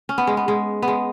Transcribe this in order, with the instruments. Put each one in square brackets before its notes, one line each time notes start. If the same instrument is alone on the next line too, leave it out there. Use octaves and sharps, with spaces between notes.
[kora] C#4
B3
G#3
B3
G#3
B3
G#3